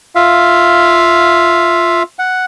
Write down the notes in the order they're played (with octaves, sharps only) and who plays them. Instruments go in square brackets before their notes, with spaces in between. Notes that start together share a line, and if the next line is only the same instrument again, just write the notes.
[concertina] F4 E5 F5
F#5